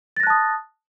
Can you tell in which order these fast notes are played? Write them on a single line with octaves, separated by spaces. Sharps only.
A6 A#6 F#6 A5 D#6